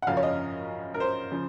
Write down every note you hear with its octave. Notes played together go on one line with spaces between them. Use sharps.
F#5
F#2 C#3 F3 F5
C#5
D#5
A#4
C5
C#3 F3